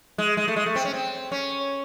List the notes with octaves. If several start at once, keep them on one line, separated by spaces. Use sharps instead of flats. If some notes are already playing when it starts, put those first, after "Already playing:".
G#3
G#3
A3
G#3
A3
C4
C#4
C4
C#4